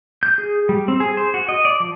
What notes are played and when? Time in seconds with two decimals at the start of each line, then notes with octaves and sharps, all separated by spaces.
0.23 G6
0.38 G#4
0.69 G3
0.88 C4
1.00 G#4
1.17 C5
1.34 F#4
1.49 D#5
1.65 D5
1.80 F3